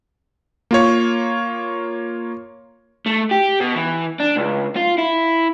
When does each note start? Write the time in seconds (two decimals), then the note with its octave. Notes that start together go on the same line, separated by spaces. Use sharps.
0.71 A#3 F4 C#5
3.06 A3
3.31 G4
3.61 B2
3.76 E3
4.20 D4
4.36 C#2
4.76 F4
4.98 E4